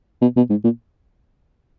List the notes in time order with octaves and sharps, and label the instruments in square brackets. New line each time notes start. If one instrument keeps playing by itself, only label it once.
[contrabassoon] B2
B2
G#2
A#2